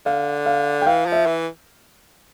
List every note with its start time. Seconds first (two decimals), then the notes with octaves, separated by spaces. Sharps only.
0.06 D3 F5
0.46 F5
0.82 G5
0.87 E3 F5
1.06 F3
1.12 E5
1.26 E3